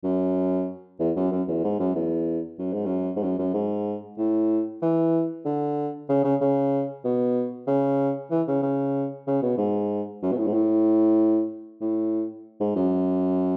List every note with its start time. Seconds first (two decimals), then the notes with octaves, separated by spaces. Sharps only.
0.04 F#2
1.00 E2
1.16 F#2
1.31 F#2
1.48 E2
1.64 G#2
1.79 F#2
1.95 E2
2.58 F#2
2.73 G#2
2.85 F#2
3.16 G#2
3.23 F#2
3.39 F#2
3.54 G#2
4.17 A2
4.82 E3
5.45 D3
6.09 C#3
6.24 C#3
6.41 C#3
7.04 B2
7.67 C#3
8.30 E3
8.48 C#3
8.62 C#3
9.27 C#3
9.42 B2
9.58 G#2
10.22 F#2
10.32 B2
10.37 A2
10.47 G#2
10.53 A2
11.81 A2
12.60 G#2
12.76 F#2